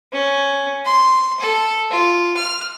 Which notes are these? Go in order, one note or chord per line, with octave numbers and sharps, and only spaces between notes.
C#4
C6
A4
F4
F6